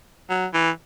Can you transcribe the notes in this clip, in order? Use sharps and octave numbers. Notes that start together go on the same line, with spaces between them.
F#3
E3